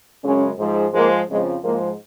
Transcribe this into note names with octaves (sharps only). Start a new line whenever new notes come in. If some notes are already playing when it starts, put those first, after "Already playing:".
F#2 C#3 G#3 C#4
G#2 F3 G#3
G#2 F3 G#3 A#3
F2 C#3 F3 G#3
G#2 F3 G#3 A#3